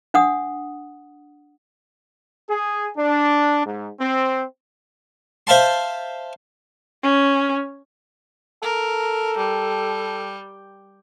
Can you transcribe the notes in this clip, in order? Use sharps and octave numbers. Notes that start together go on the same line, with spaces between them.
D4 F#5 D#6
G#4
D4
G#2
C4
C5 E5 F5 A5 C6
C#4
A4 A#4
G3